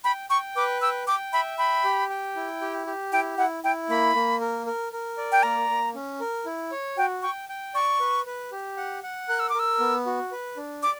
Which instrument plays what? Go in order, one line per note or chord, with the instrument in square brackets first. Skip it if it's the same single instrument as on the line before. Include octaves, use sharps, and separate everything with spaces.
[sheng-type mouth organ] G5 [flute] B5
[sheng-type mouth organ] G5 [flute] C#6
[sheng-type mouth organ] B4 [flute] D6
[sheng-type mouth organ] G5 [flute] E6
[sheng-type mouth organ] G5 [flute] D6
[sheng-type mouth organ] E5 [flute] B5
[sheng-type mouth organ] G5 [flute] B5
[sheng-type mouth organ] G4
G5
E4
G4
G4
[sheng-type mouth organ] E4 [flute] G5
[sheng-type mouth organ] E4 [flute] F#5
[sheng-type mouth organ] E4 [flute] G5
[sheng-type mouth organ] A#3 [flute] B5
[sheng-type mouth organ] A#3
A#4
A#4
A#4
D5
[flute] G5
[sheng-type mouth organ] A#3 [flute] A#5
[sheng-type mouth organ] A#3
C#4
A#4
E4
C#5
[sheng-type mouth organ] F#4 [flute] G5
[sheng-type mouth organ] G5 [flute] C#6
[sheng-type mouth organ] G5
[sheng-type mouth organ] D5 [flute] C#6
[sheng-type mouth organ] B4
B4
G4
F#5
F#5
[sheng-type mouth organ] A#4 [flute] F#6
[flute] E6
[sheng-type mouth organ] A#4 [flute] D6
[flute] E6
[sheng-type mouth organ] B3
F#4
B4
D4
[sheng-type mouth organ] D5 [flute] D6